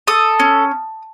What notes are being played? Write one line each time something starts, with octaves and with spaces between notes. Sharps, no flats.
A4 D#6
C#4